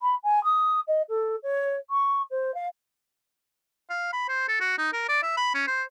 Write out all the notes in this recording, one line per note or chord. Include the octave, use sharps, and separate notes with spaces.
B5
G#5
D#6
D#5
A4
C#5
C#6
C5
F5
F5
B5
C5
A4
F#4
D#4
A#4
D5
E5
B5
C#4
C5